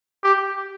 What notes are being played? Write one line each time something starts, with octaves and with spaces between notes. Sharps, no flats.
G4